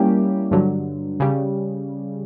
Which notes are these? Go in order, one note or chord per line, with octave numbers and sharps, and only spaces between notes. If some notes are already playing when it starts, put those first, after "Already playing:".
Already playing: G3 A#3 C#4 E4 G4
G2 D3 F#3
C#3 G3